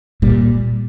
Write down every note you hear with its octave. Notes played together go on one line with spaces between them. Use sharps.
A#2 G3